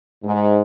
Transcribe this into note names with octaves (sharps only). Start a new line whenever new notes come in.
G#2